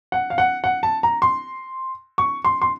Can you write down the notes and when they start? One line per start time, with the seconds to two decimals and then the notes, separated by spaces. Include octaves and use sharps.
0.12 F#5
0.30 F5
0.38 F#5
0.64 F#5
0.83 A5
1.03 A#5
1.22 C6
2.18 C#6
2.45 C6
2.62 C6